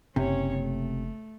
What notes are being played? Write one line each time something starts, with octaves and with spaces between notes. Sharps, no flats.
F#1 C3 C#4 C#5
A3